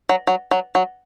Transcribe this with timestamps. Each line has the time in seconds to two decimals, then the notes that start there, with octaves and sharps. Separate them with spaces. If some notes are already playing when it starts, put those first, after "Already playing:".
0.09 F#3
0.27 F#3
0.51 F#3
0.75 F#3